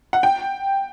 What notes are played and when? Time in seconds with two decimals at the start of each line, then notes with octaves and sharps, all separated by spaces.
0.13 F#5
0.23 G5